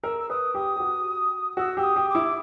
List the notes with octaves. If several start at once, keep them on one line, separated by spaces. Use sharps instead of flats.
A#4 E6
E6
B4 D#6
G4 D#6
G4
F#4
F#4 E6
G4 E6
D#6
G4
D6
E4